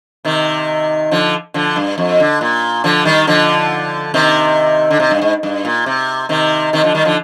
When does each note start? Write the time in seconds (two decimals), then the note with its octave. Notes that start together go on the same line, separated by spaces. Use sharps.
0.25 C3 D#3
1.11 D3 F3
1.54 D3 F3
1.76 G2
1.98 F2
2.20 D3
2.41 A#2
2.84 D3 F3
3.05 D#3 G3
3.27 D3 F3
4.14 C3 D#3
4.91 D3
5.00 C3
5.11 G2
5.21 G#2
5.43 G2
5.65 A#2
5.86 C3
6.29 C3 D#3
6.73 C3 D#3
6.83 D3 F3
6.94 D#3 G3
7.05 D3 F3